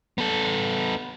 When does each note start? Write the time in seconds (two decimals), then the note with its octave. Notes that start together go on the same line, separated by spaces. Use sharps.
0.18 B3 A4